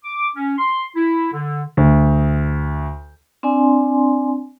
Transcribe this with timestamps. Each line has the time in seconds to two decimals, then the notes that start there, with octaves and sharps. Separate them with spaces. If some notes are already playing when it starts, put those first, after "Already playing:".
0.04 D6
0.36 C#4
0.58 C6
0.96 E4
1.33 D3
1.77 D2
3.43 C4 D4 D5 G#5 C6